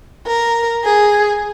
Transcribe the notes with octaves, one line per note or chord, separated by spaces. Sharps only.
A#4
G#4